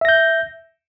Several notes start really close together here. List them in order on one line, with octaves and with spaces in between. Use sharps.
E5 A#6 G6